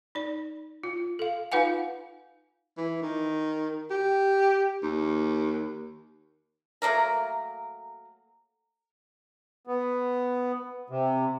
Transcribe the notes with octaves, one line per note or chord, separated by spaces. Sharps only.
D#4 D5
F4
A4 F5
D#4 F4 B4 F5 F#5 G#5
E3
D#3
G4
D#2
F#3 A3 A#3 A#4
B3
C3